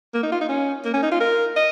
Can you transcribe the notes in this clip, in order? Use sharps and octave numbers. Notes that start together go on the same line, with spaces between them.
A#3
D#4
F4
D#4
C#4
A#3
C#4
D#4
F4
A#4
D#5